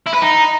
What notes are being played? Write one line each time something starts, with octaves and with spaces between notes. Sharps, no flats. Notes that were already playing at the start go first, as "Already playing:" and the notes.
E4
B4
D#4